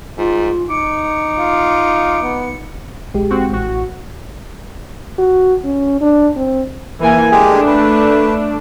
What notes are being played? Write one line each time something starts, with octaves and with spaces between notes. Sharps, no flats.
G#2 F4
D#4 D6 C#7
F4
B3
A#1 G#3 G4
C4 F#4
A1 F#4
F#4
C#4
D4
C4
E3 A#3 G#5
G#3 A3 D4 G4 G#4
B4